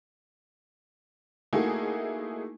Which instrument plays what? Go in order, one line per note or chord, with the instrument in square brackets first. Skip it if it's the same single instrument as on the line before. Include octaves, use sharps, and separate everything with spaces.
[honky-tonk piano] A3 A#3 D#4 E4 F#4 G#4